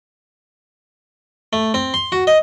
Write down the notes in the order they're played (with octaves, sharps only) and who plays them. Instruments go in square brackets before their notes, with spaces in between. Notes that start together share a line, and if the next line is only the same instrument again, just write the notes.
[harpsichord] A3
C4
C6
F#4
D#5